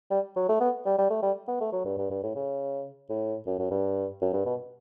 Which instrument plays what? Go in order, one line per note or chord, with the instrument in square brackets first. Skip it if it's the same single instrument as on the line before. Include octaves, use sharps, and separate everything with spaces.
[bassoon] G3
F#3
A3
B3
G3
G3
A3
G3
B3
A3
F#3
G2
G2
G2
A2
C#3
A2
F#2
F#2
G2
F#2
G2
B2